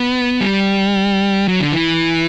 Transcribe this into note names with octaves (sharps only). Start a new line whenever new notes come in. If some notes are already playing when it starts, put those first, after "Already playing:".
Already playing: B3
G3
F#3
D3
E3